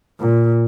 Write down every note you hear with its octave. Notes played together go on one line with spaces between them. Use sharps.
A#2